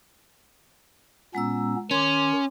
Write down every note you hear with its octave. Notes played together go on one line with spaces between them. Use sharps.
A#2 G#3 B3 C#4 A#5 E6
D#3 C#4 C6 D6